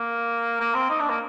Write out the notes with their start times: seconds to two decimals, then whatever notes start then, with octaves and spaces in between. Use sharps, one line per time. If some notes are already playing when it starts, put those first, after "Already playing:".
Already playing: A#3
0.60 A#3
0.74 C4
0.90 D#4
1.00 D4
1.09 A#3